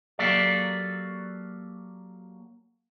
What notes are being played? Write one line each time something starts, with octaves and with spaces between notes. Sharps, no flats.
F#3 A#3 G4 A4 D5